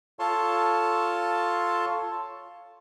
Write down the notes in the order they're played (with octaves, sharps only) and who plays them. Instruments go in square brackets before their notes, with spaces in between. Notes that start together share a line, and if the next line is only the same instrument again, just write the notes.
[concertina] F4 A4 C#5 A5 C6